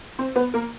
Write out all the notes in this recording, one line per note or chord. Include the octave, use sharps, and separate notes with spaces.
C4 C5
B3 B4
A#3 A#4